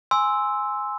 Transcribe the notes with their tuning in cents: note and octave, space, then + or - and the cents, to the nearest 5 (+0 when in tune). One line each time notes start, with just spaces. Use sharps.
G#5 +0 C6 +0 E6 -10